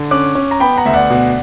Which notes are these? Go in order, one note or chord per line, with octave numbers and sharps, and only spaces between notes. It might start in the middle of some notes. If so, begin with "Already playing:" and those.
Already playing: D3
C#4 D6 F#6
C#4
A#5
B3 G5 B5
F#5 A#5
D2 E5
D5 F#5
B2